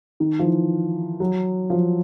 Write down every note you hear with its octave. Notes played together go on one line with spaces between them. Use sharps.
D#3
F3
E3
F#3
F3